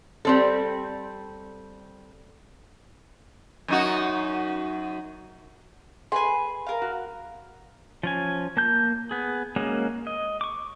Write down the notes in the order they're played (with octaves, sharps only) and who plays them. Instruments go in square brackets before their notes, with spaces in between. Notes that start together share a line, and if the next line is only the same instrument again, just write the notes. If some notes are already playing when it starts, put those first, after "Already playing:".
[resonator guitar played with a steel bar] G3 C4 A4
[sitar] F#2 D#4 F#4
[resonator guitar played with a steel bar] G#4 B4 [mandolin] G#5 C6
[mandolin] A#4 F5
[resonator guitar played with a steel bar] F#4
[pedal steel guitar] F3 C#4 G#5
A#3 A5 G6
B3 G#4
G#3 A#3 C#4 F#4 G#4
D#5
C#6 D6